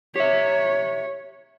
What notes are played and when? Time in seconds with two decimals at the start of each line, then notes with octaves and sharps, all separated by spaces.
0.16 G4 C#5 E5